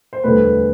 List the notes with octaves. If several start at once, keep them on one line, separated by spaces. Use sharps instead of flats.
C5
E1 D2 D3 G3 B4